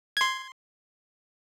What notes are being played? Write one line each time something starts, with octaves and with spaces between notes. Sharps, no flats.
C6 G#6